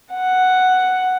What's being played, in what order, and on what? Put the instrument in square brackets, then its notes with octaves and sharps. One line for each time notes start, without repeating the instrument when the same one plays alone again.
[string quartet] F#5